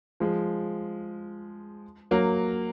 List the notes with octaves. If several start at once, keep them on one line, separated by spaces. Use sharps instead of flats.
F3 G#3
F#3 A#3